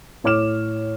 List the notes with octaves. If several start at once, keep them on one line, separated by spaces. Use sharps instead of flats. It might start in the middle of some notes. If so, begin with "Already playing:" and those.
A2 C#5 D6 F6 E7